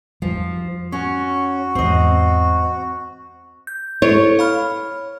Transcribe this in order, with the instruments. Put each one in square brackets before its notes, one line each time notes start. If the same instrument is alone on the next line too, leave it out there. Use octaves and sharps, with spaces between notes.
[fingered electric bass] F2 G3 [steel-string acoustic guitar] F3
[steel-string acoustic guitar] C#4 [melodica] F#4
[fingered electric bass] E2 G#2 [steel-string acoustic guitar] C4 D#5
[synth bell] G6
[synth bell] E4 A4 C5 [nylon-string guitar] C#5
[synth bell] F5 B5 F6